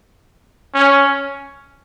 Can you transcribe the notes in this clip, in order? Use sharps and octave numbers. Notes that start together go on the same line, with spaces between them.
C#4